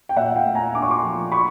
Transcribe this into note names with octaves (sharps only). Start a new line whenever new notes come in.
G5
A#2 E5 F#5
F5 G5
A3
G#5 A#5
D4 D6
C#6
C6 D6
F3
B5 C#6